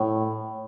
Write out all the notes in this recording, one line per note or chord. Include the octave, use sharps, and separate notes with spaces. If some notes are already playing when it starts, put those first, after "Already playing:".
Already playing: A2